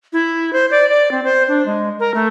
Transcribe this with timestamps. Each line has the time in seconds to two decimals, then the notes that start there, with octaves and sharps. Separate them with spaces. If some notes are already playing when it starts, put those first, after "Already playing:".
0.13 E4
0.53 C5
0.71 D5
0.89 D5
1.11 C4
1.24 C5
1.48 D4
1.66 G#3
2.00 A#4
2.14 A3